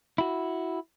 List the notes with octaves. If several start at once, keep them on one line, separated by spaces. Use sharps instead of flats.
E4 F#4